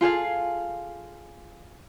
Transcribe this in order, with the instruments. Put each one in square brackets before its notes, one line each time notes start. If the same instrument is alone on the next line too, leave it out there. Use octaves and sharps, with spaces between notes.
[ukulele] F4 G#4 A4 F5